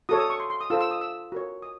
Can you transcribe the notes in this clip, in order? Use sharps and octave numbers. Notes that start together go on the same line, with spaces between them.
F#4 A4 C#5 D#6
D#6
C#6
C6
C6
D#6
F4 A4 C5 E6
E6
D#6
E6
F#4 A#4 C#5
D#6